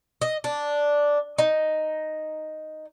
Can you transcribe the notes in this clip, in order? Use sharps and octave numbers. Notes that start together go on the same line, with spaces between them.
D#5
D4
D#4